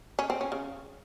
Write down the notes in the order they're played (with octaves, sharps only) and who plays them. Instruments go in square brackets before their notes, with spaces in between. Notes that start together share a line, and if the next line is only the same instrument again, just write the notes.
[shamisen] C#4
C4
C#4
C#3